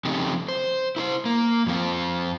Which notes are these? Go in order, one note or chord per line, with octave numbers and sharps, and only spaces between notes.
C#3 F3 A3 C4 D#4 G4
C5
E4 A#4 C5
A#3
F2 F3 C4 F4